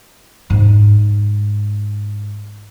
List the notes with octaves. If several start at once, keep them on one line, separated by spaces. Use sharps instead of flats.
G#2 D#4